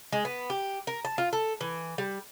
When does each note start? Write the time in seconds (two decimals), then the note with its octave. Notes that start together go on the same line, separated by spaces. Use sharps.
0.12 G#3
0.25 B3
0.50 G4
0.87 A#4
1.05 A5
1.18 F4
1.33 A4
1.61 E3
1.98 G3